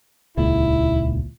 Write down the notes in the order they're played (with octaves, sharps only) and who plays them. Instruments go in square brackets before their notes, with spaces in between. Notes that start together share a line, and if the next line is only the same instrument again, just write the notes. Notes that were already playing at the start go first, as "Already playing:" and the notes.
[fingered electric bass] D#1 C#2 A#2 [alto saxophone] E4